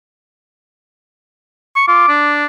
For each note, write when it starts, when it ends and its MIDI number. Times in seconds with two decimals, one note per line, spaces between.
1.76 1.83 85
1.88 2.08 65
1.88 2.39 86
2.08 2.46 62